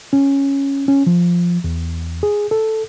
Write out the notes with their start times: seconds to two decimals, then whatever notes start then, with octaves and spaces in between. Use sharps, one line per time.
0.13 C#4
0.88 C#4
1.07 F3
1.64 E2
2.23 G#4
2.51 A4